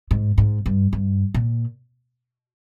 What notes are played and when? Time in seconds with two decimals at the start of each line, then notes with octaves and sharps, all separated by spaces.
0.11 G#2
0.38 G#2
0.66 G2
0.93 G2
1.34 A#2